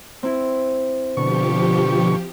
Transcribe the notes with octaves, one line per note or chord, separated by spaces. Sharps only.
C4 E4
B2 D3 F3 G4 C#6